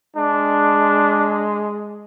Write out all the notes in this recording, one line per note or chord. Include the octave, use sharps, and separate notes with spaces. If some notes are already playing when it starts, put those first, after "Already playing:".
G#3 D4